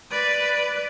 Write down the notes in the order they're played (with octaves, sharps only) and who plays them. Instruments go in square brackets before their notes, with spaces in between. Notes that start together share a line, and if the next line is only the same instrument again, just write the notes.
[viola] B4 D5